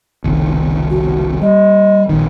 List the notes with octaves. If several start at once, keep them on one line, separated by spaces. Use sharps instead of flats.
F#1 C2 D#3
F#4
G3 D#5
A#1 D#3